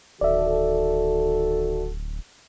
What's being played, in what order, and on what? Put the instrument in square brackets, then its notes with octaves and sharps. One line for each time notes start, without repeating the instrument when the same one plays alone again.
[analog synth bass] D1 [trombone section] D#3 F#4 A4 [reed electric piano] D5 E5